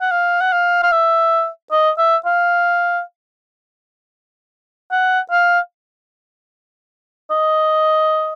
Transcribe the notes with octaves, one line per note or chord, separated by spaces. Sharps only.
F#5
F5
F#5
F5
F5
E5
D#5
E5
F5
F#5
F5
D#5